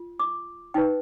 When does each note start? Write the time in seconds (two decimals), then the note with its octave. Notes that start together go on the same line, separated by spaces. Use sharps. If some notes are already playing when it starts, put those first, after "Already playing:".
Already playing: F4
0.20 D6
0.74 D#4 B4 G5